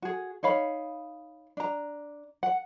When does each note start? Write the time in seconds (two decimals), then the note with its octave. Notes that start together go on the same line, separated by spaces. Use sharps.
0.02 F#4 G#4
0.43 D#4 C#5 F5 B5
1.57 D4 A#5
2.43 F#5